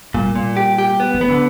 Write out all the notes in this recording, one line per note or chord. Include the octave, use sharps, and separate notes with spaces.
A#2 G3
A#2
G4
G4
B3
E3
B3
D3